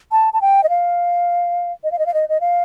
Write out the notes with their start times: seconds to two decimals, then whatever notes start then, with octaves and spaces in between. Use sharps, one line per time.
0.12 A5
0.33 A5
0.42 G5
0.64 D#5
0.69 F5
1.84 D#5
1.92 F5
1.99 D#5
2.06 F5
2.14 D#5
2.29 D#5
2.41 F5